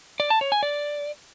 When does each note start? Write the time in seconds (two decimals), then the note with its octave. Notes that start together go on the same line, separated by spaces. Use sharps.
0.20 D5
0.30 A5
0.41 C#5
0.52 G#5
0.63 D5